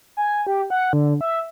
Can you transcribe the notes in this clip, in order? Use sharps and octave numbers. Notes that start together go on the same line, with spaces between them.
G#5
G4
F#5
D3
E5